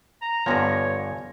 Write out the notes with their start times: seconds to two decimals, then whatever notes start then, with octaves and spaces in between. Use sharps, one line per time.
0.22 A#5
0.46 G2 D3 F3 B3 C#5 G#5 A#6